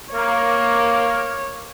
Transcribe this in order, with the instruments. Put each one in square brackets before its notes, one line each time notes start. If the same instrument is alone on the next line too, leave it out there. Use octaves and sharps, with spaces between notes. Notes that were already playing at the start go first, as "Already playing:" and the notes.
[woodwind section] A#3 [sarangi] C#5